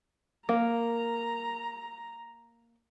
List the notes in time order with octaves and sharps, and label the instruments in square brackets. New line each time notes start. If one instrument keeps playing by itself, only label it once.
[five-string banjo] A#3 [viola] A#5